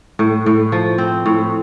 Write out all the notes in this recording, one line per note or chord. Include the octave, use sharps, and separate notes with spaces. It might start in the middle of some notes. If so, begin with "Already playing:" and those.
A2
A2
F3
C4
A2